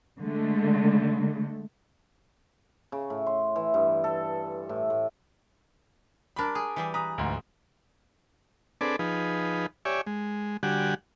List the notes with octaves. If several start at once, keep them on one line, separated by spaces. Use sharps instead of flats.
D3 G#3 A3
C#3
A2
C6
E3
G2
A4
A2
A2
G3 D4 A#4 B5
G#4
E3 G3 G#4
B4 A#5 D#6
D2 G#2
C4 D4 G#4 A4 B4 D5
F3 D#4 G#4 B4
G4 C#5 D5 E5 G#5
G#3
D3 G3 F#4 G4 F#5 G#5